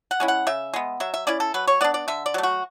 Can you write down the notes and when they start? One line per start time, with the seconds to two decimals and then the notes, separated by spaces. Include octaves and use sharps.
0.11 F#5
0.20 G#3 C#4 E4
0.28 F#5
0.47 C#3 E5
0.74 G#3 B3
1.00 F#3 E5
1.14 E5
1.27 C#4 E4 D5
1.40 A4
1.54 F#3 B4
1.67 C#5
1.81 B3 D4 D5
1.94 D5
2.08 D3 E5
2.26 D5
2.34 F#3 A3
2.43 F#4